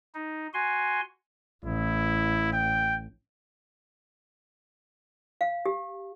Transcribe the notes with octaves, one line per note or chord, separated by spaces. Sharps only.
D#4
F#4 G#5 C6
A1 E4
G5
F5
G4